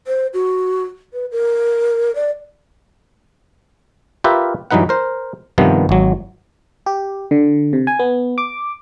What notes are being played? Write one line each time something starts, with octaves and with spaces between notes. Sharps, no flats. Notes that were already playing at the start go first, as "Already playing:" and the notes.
C5
F#4
B4
A#4
D5
F4 G4 A#4 B4 E5
G2 E3 F#3 D#4 B4 F#5
A#4 C5
G2 C3 D#3 F3 B3
G#1 F#3
G4
D3
C3
G#5
B3
D6